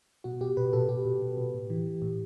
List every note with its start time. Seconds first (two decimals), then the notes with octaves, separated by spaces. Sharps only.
0.24 B2 F#4
0.41 B2 G4
0.57 B2 B4
0.73 B2 A4
0.89 B2 G4
1.05 B2
1.22 B2
1.37 B2
1.54 A2
1.70 E3
1.87 E3
2.02 A2